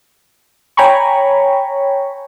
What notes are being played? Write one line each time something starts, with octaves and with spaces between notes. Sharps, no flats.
C#5 G5 G#5 A#5 B5 C#6